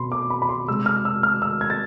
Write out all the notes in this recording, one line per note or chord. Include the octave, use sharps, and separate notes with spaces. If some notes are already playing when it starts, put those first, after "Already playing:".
Already playing: B2 C4 B5 C6
D6
B5
B5
C6
C3 G#3 C4 E6
F6
E6
F6
E6
G#6
A6